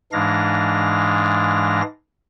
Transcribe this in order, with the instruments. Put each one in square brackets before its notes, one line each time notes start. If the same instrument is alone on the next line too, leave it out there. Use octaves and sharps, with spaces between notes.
[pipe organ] G#2 E3 G#3 D4 F5 A#6